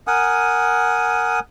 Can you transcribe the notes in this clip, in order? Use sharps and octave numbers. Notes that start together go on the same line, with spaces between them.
A#4 F#5 G#5 D#6